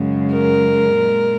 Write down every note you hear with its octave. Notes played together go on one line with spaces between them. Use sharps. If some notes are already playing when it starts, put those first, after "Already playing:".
Already playing: F#2 C#3 G#3
A#4
A#2
G#3